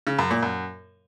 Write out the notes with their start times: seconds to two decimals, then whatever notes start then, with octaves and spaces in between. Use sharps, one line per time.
0.07 C#3
0.19 F#2
0.31 A#2
0.43 F#2